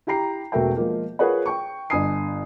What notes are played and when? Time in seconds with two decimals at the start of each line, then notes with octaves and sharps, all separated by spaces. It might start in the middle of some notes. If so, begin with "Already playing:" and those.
0.07 E4 G4 G5 A#5 C7
0.52 E1 A3 F#4 A#4 E5 G5
0.76 F3 G#3 A#3 F4
1.19 F4 G#4 A#4 B4 C#5 F#5
1.46 G5 C#6
1.90 G1 D4 D#5 G#5 D#6 C7